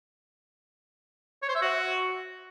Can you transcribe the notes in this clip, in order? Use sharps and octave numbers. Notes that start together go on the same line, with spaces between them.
C#5
C5
E5
F#4